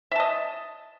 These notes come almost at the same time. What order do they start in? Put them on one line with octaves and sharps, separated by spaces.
E5 A5 D#5